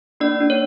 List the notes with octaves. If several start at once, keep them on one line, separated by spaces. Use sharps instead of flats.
A#3 D4 D5
D4
C#5